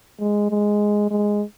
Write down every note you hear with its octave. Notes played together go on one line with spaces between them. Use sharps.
G#3
G#3
G#3